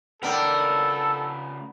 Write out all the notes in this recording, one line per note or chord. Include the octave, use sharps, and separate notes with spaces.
C#2 B3 D4 A4 A#4 G5